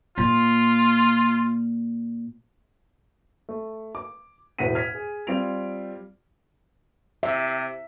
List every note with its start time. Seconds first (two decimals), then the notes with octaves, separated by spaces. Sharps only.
0.18 A#2 F4
3.49 A3
3.95 D6
4.59 E1 E2 A2 F#5 B6 D#7
4.75 F6 G#6 B6
4.95 G#4
5.27 G3 C4 F4 D7 F7
7.23 C3 E5